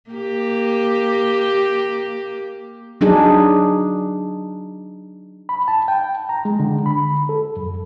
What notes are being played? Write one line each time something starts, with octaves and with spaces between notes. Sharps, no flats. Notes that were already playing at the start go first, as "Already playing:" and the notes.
A#3 G4
F#3 D4 D#4 G#4
B5
A5
G5
A#5
G#3
D3
B5
A4
F#2